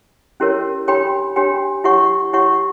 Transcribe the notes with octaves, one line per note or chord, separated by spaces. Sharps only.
C#4 E4 G4 A#4 C#5
D4 G4 C#5 G5 B5
D4 G4 C#5 G5 B5
E4 G4 C#5 F#5 C#6
E4 G4 C#5 F#5 C#6